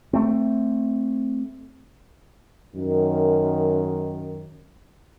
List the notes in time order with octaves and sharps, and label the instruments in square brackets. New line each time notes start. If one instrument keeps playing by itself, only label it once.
[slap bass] A3 C4
[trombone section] F#2 D#3